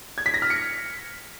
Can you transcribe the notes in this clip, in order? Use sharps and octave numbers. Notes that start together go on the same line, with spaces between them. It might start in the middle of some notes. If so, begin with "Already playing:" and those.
G#6
B6
A#6
F6
C#7